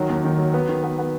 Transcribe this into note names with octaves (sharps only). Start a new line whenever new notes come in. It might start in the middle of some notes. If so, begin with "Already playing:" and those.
Already playing: D#3 F#3
D#2
D#3
F#3
B3
D#3
B3
B3